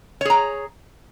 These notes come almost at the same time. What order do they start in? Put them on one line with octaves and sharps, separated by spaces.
C#5 G#4 A#5